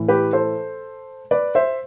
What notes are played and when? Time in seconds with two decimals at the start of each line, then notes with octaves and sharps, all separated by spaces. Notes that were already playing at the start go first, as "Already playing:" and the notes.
Already playing: A2 E3
0.08 G4 B4
0.33 A4 C5
1.31 B4 D5
1.55 C5 E5